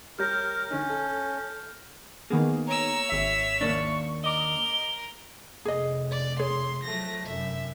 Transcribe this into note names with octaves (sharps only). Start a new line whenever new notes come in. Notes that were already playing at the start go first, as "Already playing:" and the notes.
G3 G4 A#4 C#5 F6 G6 A#6
D3 C#4 D#4
A4
D#3 A#3 B3 G#4
C#5 A#5 E6
G#1 E5 B6
D#2 A#3 D4 C#6
A#4 D#5 D6 G7
F1 G#4 D#5
D5
G#4 C#5 C6
F3 F#3 A3 A#6
F1 F#2 E5